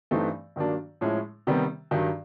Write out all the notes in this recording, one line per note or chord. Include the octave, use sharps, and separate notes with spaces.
G2 E3 A3 C4 D#4
G2 D#3 F#3 A#3 D4
A2 F3 G#3 C#4 E4
C3 D#3 G3 B3
G2 D#3 F#3